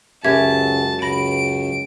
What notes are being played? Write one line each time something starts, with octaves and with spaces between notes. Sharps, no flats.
C#2 F#2 F#3 G4 E5 A5 G#6
C#2 B5 A#6 D7